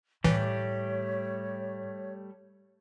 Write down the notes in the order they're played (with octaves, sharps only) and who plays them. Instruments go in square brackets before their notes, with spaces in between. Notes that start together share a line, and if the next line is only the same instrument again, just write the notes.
[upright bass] A2 [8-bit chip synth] E3 [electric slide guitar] G3 A3 G4 [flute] C#5